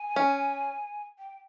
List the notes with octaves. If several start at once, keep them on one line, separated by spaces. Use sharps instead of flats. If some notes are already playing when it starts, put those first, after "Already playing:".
Already playing: G#5
C#4
G5